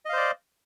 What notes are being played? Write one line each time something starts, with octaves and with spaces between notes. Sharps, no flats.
C5 D5 D#5 F5